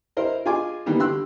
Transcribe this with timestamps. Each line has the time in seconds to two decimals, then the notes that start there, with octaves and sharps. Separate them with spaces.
0.17 E4 A#4 C5 D#5
0.46 F4 G#4 D#5 G#5 D6
0.86 D3 E3 G3 A#3 B3 D#4
0.99 D3 G4 C6 E6 F#6